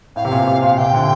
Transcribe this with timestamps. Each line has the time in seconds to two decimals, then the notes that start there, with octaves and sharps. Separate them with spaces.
0.16 A2 F5
0.25 C3
0.31 A#2
0.47 C3
0.62 A#2
0.78 C3 G5
0.94 D3